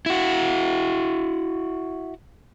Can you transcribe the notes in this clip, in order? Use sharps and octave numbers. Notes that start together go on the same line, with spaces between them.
E4 F#4